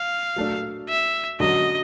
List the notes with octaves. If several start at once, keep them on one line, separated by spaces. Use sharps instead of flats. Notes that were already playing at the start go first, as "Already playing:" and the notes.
Already playing: F5
F#3 A3 D4
E5
F#2 D3 F#3 D#5